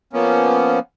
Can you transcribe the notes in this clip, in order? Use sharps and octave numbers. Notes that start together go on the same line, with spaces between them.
F3 A#3 B3 C#4